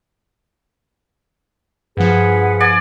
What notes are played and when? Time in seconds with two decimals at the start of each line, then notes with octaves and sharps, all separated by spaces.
1.97 G2 F3 G#4 B4 F#5
2.60 D5 G#5